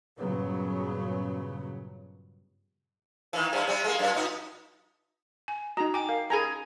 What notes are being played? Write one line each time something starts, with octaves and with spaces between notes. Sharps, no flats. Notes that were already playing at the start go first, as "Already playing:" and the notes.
G2 A#2 C#3 F#3 B3
D#3 E3
G2 C3
C3 G3
G#3 A#3
F#2 D4
A#2 D#4
G#5
D#4 F#4 A#5
G5 G#5 D6
A#4 F5
G#4 A#4 G#5 A#5 B5